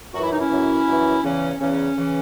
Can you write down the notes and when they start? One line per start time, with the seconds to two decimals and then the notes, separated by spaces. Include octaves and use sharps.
0.13 F#2 E3 F#4
0.23 E4
0.31 D#4
0.40 C#4 E4
0.50 F#2 E3
0.86 F#2 E3
1.23 E2 C#3 E3 C#4
1.60 E2 C#3 E3 C#4
1.96 C#3 E3